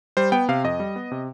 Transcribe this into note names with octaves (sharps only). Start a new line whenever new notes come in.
G3 C5
B3 G5
C3 F5
F2 D#5
G3
B3
C3